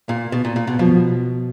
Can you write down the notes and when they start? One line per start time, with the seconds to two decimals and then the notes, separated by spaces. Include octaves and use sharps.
0.09 A#2
0.32 B2
0.45 A#2
0.56 A#2
0.67 B2
0.79 B2 F3